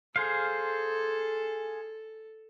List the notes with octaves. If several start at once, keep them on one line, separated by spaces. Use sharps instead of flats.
G#4 A4 C5 F5